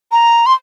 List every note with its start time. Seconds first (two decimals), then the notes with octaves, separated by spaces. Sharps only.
0.12 A#5
0.46 C6